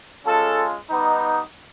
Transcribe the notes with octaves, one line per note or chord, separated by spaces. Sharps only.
G#3 C#4 F4 A4
G3 B3 D#4